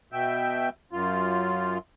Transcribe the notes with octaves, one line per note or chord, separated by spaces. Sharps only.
B2 E5 G5
F#2 F4